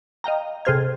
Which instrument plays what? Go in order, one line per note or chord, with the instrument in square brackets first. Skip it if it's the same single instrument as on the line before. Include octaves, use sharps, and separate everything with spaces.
[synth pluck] D#5 F5 G5 A#5
C3 G#4 A4 C5 F6 G#6